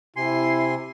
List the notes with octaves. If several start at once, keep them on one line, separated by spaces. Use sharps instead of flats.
C3 E4 G#5 C6 C7